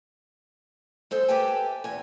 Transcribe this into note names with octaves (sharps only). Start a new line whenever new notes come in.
G#3 A4 C5
G4 A4 B4 E5 G5 G#5
E2 G#5